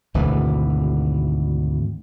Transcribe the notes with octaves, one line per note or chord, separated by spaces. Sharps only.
G#1 D2 B2 E3